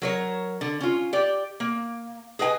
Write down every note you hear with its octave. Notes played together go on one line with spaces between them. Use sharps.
F#3 A#4 C#5
D3
C#4 F4
G4 D5
A#3
G#4 B4 D#5 G5 G#5